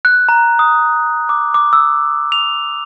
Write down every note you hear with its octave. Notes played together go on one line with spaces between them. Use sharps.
F#6
A#5
D#6
D6
D6
E6
F7